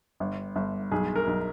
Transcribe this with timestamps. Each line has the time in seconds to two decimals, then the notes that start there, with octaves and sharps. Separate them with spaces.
0.20 G1
0.56 G1
0.92 B1 G#4
1.16 A#4
1.27 B1